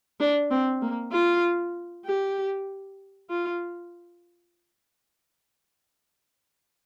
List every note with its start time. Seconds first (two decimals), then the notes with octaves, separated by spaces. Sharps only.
0.20 D4
0.50 C4
0.82 A#3
1.12 F4
2.05 G4
3.30 F4